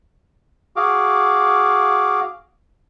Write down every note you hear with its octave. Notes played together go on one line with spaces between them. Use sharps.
F#4 G#4 F5 D6